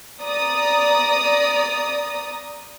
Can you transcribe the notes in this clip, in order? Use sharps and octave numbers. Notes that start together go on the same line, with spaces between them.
D5 A#5 D#6